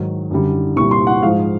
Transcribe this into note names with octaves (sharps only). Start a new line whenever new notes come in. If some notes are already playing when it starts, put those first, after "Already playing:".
Already playing: G#2 D#3 F#3
F#2 D3 G3
C2 A#2 G3 C#6
C6
F#5
G#2 F3 G#3 F5